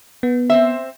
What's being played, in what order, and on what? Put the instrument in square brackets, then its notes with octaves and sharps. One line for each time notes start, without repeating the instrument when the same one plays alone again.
[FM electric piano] B3
[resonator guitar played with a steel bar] C4 C5 E5